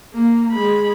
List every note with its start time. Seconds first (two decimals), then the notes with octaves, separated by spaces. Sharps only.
0.13 A#3
0.52 G#3 B5